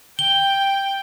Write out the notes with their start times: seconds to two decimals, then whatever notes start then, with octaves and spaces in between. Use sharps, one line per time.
0.19 G5 G7